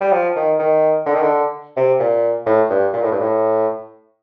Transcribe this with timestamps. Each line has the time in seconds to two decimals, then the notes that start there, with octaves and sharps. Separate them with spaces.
0.01 G3
0.12 F3
0.36 D#3
0.59 D#3
1.06 D3
1.14 D#3
1.22 D3
1.77 C3
2.00 A#2
2.46 A2
2.70 G2
2.93 A#2
3.03 A2
3.11 G2
3.21 A2